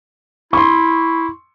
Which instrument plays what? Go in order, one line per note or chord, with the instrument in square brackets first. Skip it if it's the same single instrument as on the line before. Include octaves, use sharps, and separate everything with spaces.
[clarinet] E4 [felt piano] C6 C#6